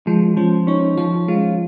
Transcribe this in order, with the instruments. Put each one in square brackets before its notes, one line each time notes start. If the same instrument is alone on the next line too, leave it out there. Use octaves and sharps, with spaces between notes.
[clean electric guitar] F3 [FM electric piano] G#3
[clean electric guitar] F3 [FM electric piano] C#4
[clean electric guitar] C#4 [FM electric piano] D#4
[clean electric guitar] F3 [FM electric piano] F4
[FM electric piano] G#3 [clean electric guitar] F4